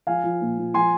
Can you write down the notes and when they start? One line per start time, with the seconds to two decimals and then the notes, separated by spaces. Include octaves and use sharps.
0.07 F3 F5 G#5
0.24 F3
0.41 A#2
0.58 A#2
0.74 F3 G#5 C6